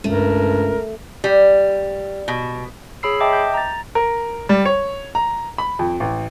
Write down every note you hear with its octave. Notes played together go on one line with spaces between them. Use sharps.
C#2 G2 A3 A#4
G3
B2
G#4 C#5 B5 E6 C7
D#5 E5 G5 A5 D6
G6
A#5 A6
A#4
G3
C#5
A#5
B5
F2
A1